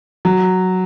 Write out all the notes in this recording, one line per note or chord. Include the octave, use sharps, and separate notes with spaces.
F#3